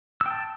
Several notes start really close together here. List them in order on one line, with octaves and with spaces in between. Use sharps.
E6 G5 A5